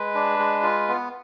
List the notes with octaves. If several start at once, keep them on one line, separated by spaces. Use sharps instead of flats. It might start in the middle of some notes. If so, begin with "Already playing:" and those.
Already playing: G#3 B4
D4
G#3
F4
B3